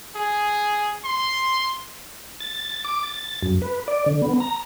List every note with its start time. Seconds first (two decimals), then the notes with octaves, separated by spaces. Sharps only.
0.16 G#4
1.05 C6
2.40 A6
2.72 A6
2.85 D6
3.03 A6
3.42 F#2
3.62 B4
3.88 D5
4.06 D3
4.22 B3
4.40 A#5